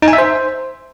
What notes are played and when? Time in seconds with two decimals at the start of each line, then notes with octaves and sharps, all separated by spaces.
0.02 D#4
0.08 G#5
0.13 E5
0.18 C5